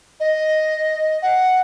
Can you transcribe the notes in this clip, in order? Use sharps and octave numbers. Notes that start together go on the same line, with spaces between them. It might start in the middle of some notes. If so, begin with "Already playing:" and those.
D#5
F#5